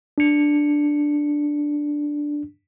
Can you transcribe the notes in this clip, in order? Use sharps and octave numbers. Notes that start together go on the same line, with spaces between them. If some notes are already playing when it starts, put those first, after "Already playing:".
D4 C#7